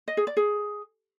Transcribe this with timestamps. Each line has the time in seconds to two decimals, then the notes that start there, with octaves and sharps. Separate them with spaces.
0.08 D#5
0.17 G#4
0.27 D5
0.37 G#4